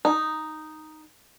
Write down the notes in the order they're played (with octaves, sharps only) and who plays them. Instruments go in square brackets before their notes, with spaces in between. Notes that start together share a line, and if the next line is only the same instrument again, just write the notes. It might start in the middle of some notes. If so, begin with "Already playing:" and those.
[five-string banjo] D#4